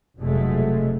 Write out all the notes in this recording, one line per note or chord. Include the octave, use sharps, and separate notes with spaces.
F1 B2 F3 F#3 G#3 A3